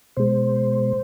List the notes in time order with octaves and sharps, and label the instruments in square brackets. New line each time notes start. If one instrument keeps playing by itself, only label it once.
[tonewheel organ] B2 G#3 C5